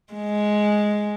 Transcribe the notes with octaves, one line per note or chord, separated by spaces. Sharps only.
G#3